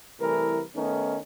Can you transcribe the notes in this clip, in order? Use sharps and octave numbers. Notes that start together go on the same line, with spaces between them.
C2 E3 A3 A#4 B4
D#3 A3 B3 C#4 D#4